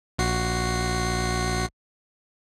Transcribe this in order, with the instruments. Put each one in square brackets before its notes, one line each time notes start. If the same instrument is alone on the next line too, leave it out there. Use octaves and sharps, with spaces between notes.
[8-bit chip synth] A#1 F#4 C7